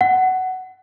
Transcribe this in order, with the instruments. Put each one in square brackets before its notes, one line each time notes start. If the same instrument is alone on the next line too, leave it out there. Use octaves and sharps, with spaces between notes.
[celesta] F#5